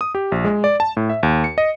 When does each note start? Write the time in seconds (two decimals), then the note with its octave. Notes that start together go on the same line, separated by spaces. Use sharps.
0.01 D#6
0.15 G4
0.32 A#1
0.45 G#3
0.64 D5
0.80 A5
0.97 A2
1.09 E5
1.23 D#2
1.44 C#7
1.58 D#5